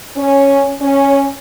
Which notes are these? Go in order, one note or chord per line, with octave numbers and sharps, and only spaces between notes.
C#4
C#4